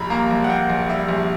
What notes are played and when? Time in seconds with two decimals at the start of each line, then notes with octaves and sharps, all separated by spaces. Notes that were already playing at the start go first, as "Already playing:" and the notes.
Already playing: A#1 G3 A#5 B5
0.10 A#3 A#5
0.31 A#1
0.44 F#5
0.49 A#3 G5
0.70 A#1
0.89 G3 E5
1.08 A#1